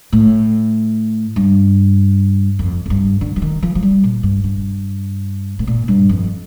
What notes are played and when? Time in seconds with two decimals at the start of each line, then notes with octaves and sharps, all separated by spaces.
0.12 A2
1.36 G2
2.59 F2
2.86 F2
2.90 G2
3.21 D3
3.36 F3
3.42 D#3
3.62 F3
3.75 F3
3.83 G3
4.04 A#2
4.23 G2
4.44 G2
5.59 A2
5.67 A#2
5.88 G2
6.09 F2